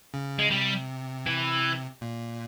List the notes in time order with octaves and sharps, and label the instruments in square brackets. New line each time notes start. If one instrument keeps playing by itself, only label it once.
[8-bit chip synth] C#3
[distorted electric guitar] G#3
[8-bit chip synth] C3 [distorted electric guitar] G3
[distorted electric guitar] E3
[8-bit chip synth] A#2